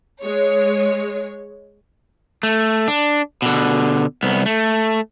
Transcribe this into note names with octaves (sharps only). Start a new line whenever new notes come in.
G#3 C#5
A3
D4
B2 D3
C2 B3
A3